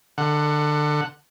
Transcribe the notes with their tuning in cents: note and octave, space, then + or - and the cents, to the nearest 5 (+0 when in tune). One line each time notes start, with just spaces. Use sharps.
D3 +25 F#5 +0